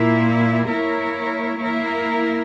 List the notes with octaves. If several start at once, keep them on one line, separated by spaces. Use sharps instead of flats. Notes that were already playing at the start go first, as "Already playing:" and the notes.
Already playing: A#2 A#3 E4
A#3 E4 A#4 C#5
A#3 E4 A#4